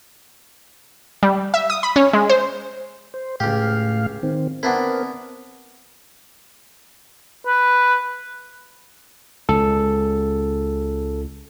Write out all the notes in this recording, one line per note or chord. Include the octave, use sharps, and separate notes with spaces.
G3
E5
D#6
B5
C#4
G#3
C5
C5
C#2 A2 G4 F5
D#3 C4
B3 C4 D4 E4 A#4
B4
C#2 A4